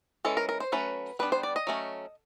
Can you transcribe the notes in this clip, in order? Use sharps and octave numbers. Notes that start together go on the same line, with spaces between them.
E3 G#3 C#4 A4
A#4
A#4
C5
F#3 A3 C#4 B4
G3 B3 D4 B4
C5
D5
D#5
F#3 A3 C#4